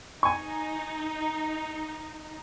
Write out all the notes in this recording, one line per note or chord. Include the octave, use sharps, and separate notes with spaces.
D#4 G#5 C#6